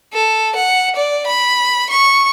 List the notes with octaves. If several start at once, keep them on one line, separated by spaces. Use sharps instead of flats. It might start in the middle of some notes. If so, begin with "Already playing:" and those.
A4
F#5
D5
B5
C#6